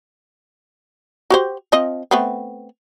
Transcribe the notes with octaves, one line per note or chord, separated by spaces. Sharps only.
F#4 G4 C5
F3 C4 D#5
A3 B3 C4